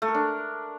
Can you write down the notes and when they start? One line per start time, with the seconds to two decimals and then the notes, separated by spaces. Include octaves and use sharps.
0.02 A3
0.08 A#4
0.15 D4